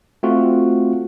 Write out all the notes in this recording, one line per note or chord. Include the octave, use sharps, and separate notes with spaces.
A3 C4 F4 F#4